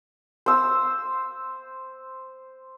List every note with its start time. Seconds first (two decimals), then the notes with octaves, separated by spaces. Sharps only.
0.46 C5 E6